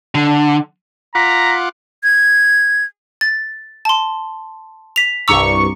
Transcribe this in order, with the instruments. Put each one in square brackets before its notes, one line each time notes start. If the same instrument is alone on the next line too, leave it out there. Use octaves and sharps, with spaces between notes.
[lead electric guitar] D3
[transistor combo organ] F4 F#5 D6 [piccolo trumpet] A#5 [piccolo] B6
[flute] G#6
[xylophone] A6
A5 C6
B6 F7
[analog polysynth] C2 G2 C#6 [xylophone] A#5 D6 E6